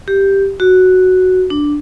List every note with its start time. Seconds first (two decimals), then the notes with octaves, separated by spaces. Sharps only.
0.08 G4
0.60 F#4
1.50 D4